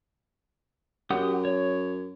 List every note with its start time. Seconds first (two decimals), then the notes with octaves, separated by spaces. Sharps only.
1.10 F#2 G4 F#5 D#6
1.45 C#5